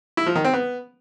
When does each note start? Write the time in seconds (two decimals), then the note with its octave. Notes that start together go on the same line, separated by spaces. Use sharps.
0.17 E4
0.26 F3
0.35 D#3
0.44 C4
0.54 B3